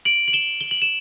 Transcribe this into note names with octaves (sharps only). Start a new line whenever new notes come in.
D7 F#7
F#7
E7 G7
G7
F#7
E7